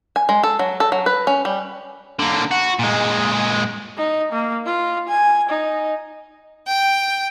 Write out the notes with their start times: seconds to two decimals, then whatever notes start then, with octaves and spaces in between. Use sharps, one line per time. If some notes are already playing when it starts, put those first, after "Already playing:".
0.16 G#5
0.29 G#3
0.43 A4
0.59 F#3
0.80 A4
0.92 F#3
1.06 B4
1.27 C#4
1.45 G3
2.19 D3 A#3
2.51 F#4
2.79 A#2 G#3
3.97 D#4
4.32 A#3
4.66 F4
5.08 G#5
5.49 D#4
6.67 G5